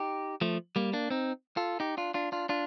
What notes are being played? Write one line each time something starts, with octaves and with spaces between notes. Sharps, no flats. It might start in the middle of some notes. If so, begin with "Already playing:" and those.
Already playing: D#4 G4
F3 A3
G3 A#3
A#3 D4
C4 D#4
F4 A4
D#4 G4
D4 F4
D4 F4
D4 F4
D4 F4